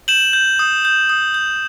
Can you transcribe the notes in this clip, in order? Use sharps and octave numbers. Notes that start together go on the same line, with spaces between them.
G6 E7 F#7
G6
D#6
G6
D#6
G6